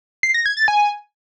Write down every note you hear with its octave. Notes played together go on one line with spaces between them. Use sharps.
C7
A#6
G#6
A6
G#5